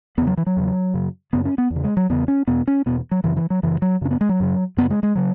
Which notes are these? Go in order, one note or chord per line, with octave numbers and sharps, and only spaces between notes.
E2 C#3 B3
F#3
E3
F#3
E2 C#3
F#2 C#3
F#2 C#3 B3
C#4
B3
E2
C#3
G#3
F#3
E2 C#3 B3
C#4
E2 B2 B3
C#4
E2 B2 B3
F#3
F#2 C#3 E3
E3
F#3
F#2 C#3 E3
F#3
F#2 C#3 C#4
B3
G#3
F#3
F#2 C#3
F#2 C#3 B3
G#3
G#3
C#3 F#3